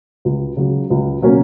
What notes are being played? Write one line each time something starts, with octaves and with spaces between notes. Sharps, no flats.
C#2
C#3 F#3
C#2
B2 F#3 A#3 C#4